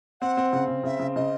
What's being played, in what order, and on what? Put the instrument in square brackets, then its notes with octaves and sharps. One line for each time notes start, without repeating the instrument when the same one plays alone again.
[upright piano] C4 [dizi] F#5
[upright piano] C4
C#3
C#3
[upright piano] C#3 [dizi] E5
[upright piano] C#3
[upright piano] C#3 [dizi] D#5